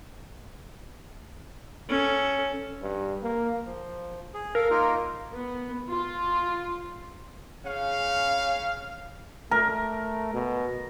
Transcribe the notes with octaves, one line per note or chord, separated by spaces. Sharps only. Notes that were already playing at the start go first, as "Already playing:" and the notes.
C#4 A4
G2
A#3
F3
G#4
A4 A#4 F5
A#3 D#4 F4
B3
F4
C#3 C#4 F5
A3 A#4
B2